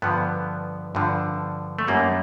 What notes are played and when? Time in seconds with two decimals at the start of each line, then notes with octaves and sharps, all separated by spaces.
0.02 G2 D3 F3 B3
0.95 G2 D3 F3
1.79 A3
1.88 F#2 D#3 G3 A#3